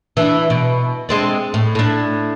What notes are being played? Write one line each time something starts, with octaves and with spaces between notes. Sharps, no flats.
E3 D4
B2
G#3 C4 D4
A2
A2 D4